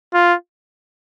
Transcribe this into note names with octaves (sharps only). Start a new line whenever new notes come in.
F4